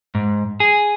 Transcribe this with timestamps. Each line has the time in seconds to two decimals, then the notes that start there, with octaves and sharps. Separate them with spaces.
0.15 G#2
0.60 G#4